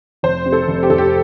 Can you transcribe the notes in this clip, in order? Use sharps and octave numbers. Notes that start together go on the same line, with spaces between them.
F1 C5
C3
A4
F1
G4
F1 A4
G4